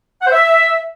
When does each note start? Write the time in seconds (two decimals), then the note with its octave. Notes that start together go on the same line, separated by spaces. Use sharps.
0.22 F#5
0.27 C5
0.32 E5